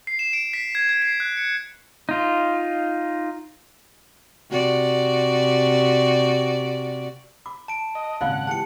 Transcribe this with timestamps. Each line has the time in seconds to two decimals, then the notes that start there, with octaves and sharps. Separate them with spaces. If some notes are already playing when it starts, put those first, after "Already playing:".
0.07 C7
0.19 E7
0.33 D7
0.53 B6
0.75 G#6
0.89 G#6
1.02 C7
1.20 F#6
1.37 C#7
2.09 D#4 F4
4.49 C3 F#4 D5
7.46 B5 D6
7.68 A5 D7
7.95 D#5
8.21 G#1 A#2 C#3 F4 D5 F5 F#5
8.47 E3 G#3 G4 A5 C#7